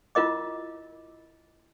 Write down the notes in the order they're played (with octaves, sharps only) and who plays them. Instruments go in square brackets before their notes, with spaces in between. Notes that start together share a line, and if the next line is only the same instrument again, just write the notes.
[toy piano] E4 F4 A#4 D#5 D6